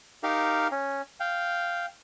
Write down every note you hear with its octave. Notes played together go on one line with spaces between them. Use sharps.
D#4 G4 A#4 F5
C#4
F5 G5